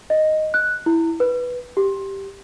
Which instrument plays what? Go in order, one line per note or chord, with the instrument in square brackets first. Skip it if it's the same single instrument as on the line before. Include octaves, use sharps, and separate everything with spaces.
[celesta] D#5
F#6
E4
B4
G4